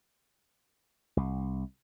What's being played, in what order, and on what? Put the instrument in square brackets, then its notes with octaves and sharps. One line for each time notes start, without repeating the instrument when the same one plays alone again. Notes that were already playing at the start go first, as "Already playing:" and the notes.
[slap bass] C2